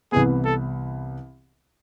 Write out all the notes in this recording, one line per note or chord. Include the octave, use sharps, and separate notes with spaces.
C2 C3 E3 B3 G#4
A4